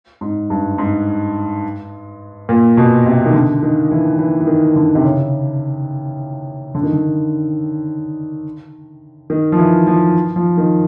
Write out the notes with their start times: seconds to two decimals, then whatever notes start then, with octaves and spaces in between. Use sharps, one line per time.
0.21 G#2
0.50 G2
0.78 G#2
2.49 A#2
2.77 B2
3.06 C3
3.26 D#3
3.34 D3
3.63 D#3
3.91 E3
4.19 E3
4.41 E3
4.47 D#3
4.76 D3
4.95 C3
5.04 C#3
6.75 D3
6.83 D#3
6.93 D3
9.30 D#3
9.52 F3
9.58 E3
9.87 F3
10.36 F3
10.58 D#3